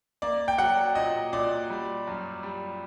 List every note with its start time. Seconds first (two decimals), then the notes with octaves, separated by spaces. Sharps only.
0.22 A#3 D5
0.48 G5
0.58 F#3 F#5
0.95 A#2 D#5
1.33 A#2 D5
1.70 G3
2.07 F#2
2.43 G3